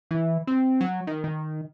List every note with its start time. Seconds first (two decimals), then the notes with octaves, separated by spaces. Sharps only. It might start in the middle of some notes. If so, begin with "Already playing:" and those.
0.11 E3
0.47 C4
0.81 F#3
1.07 D#3
1.24 D#3